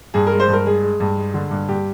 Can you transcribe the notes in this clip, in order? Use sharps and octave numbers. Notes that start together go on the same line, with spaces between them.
G2 G#4
A#4
G#3
C5
G2
A#4
G#3 G#4
G#3
G2
G#3
D3
G2
G2 G4